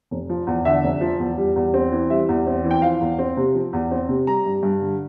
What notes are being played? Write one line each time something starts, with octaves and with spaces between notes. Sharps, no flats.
F1
F3
E2
D3 E5
F1
F3
E2
G3
E2
C4
E3
G3 E5
E2
C4
E3
G5
F3 F5
E2
C4
C3
F3
E2
C4
C3
G3 A#5
G2
G2
D3